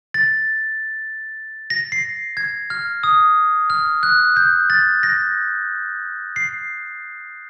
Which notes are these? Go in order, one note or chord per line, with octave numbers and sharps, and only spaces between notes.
A6
A#6
C7
G#6
F6
D#6
F6
F#6
G6
A6
A#6
C7